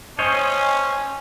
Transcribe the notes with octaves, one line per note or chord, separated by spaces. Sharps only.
C#4 C5 C#5 D#5